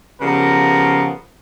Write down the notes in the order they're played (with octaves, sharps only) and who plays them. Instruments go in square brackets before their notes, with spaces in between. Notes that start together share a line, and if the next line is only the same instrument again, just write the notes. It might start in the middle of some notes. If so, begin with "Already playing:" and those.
[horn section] C#3 F3 G3 B3 A#4